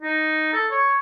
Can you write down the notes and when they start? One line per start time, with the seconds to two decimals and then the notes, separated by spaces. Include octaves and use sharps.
0.02 D#4
0.53 A4
0.71 C#5